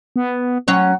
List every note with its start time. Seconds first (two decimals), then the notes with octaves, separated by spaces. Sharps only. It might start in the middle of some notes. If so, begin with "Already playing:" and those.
0.16 B3
0.68 F#3 C#4 C#5